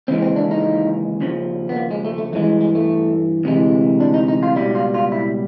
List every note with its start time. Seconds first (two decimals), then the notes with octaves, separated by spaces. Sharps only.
0.08 D#2 C#3 E3 G#3 C4
0.22 C4
0.36 D4
0.51 D#4
1.21 D#2 C#3 F3
1.69 B3
1.76 A#3
1.91 G#3
2.05 A3
2.18 A3
2.33 G2 E3 G#3 A3
2.61 G#3
2.75 A3
3.44 D2 C3 E3 G#3
4.00 D4
4.14 D#4
4.28 D#4
4.43 F4
4.56 C#2 B2 G3 E4
4.75 F4
4.94 F4
5.12 E4